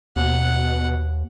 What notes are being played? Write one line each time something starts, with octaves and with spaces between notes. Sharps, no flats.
D#2 B2 F#5